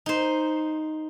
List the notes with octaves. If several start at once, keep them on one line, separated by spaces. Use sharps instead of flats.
D#4 C5